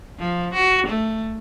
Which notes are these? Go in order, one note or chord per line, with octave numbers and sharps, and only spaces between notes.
F3
F#4
A3